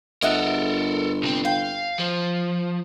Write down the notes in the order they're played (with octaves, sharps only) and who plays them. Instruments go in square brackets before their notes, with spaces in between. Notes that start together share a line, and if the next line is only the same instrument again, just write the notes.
[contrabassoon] G1 [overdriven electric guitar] A4 A#4 [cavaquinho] D#5 E5 F#5
[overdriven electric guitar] C2 C4
[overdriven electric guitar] F5 [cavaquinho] G5
[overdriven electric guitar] F3